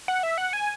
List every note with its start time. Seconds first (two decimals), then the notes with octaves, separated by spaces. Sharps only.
0.08 F#5
0.23 E5
0.38 F#5
0.53 G#5